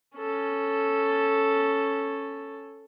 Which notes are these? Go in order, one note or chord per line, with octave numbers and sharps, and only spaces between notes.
C#4 A4